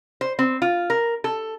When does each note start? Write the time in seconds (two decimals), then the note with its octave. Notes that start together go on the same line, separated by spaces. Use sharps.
0.21 C5
0.39 C4
0.62 F4
0.90 A#4
1.24 A4